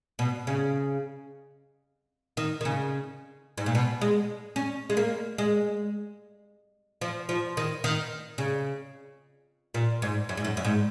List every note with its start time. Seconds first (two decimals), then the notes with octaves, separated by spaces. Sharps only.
0.19 B2
0.47 C#3
2.37 D#3
2.61 D#3
2.65 C#3
3.58 G#2
3.66 A#2
3.75 B2
4.01 G#3
4.56 C#4
4.90 G#3
4.97 A#3
5.38 G#3
7.01 F3
7.29 F3
7.57 D#3
7.84 D#3
8.38 C#3
9.74 A#2
10.02 G#2
10.29 F#2
10.37 G#2
10.45 F#2
10.57 F#2
10.65 G#2